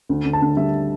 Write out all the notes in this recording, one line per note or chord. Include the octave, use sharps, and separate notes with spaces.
D2
D3
A5
D2
G3 E5